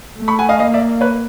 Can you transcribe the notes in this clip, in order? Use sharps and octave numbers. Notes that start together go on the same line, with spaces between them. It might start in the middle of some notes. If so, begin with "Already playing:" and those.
A3
B5 C#6
F#5 G#5
D#5 F5
A#3 D#5 F5
D5 E5
B4 C#5